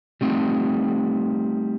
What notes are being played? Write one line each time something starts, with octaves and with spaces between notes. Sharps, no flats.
G3 A3 C4 D#4